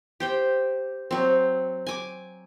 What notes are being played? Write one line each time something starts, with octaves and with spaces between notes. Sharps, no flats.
G4 C5 G5
F#3 C4
G#5 D6